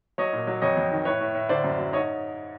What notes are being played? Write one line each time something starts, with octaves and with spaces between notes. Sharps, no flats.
F#3 C#5 D#5
A#2
F#3
F2 C#5 D#5
F2
D#3
A2 B4 C#5
A2
A2
D3 C5 D5
F#2
F#3
G#2 C#5 D#5